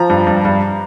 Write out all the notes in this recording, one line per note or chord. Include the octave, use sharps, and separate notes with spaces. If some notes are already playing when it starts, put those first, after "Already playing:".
Already playing: F3 A#5
G2
G2
G2